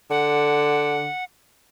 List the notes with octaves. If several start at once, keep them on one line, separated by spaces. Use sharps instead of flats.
D3 F#5